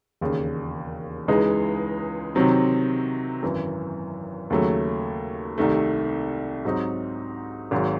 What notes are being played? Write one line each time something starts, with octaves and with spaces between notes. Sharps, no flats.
E1 D#2 C#3
C#2 C#3 E3 G#3 D#4
C3 D#3 F#3 C4
G#1 F#2 E3
D#2 C#3 F#3 A3
C2 C3 D#3 A3
G#2 F#3 C4 D#4
G#1 G#2 F#3